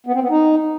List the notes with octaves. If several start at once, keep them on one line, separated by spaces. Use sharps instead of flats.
B3
C4
B3
D#4